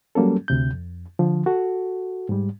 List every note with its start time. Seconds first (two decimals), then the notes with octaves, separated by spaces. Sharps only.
0.15 F#3 G3 A#3 C#4 A4
0.48 D2 C3 G6
0.73 F2
1.19 D3 F3
1.46 F#4 A4
2.29 G#2 G3